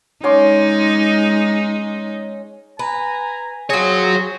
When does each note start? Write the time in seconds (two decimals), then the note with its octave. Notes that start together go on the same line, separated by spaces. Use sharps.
0.24 G#3 C#4 D#4 C6 D6
2.79 B4 G#5 A#5
3.70 C4 F4 F#4 G#4 C#5 A#6